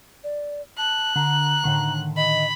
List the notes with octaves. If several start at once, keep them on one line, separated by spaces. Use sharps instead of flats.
D5
A5 F#6
D3 A#5
A2 D3 D#3
D#5 B5